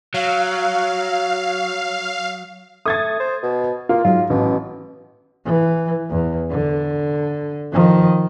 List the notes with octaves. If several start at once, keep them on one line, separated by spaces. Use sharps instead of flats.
F#3 F5
A3 D#6 G#6 A6
C5
B2
A#3 F4
G#2 F#3 F4
A1 B2
E3
E2
D3
D#3 F3